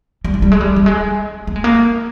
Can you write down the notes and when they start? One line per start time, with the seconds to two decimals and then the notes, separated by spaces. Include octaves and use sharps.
0.24 G3
0.34 G#3
0.42 G3
0.52 G#3
0.61 G3
0.76 G3
0.86 G#3
1.47 A#3
1.56 G#3
1.64 A#3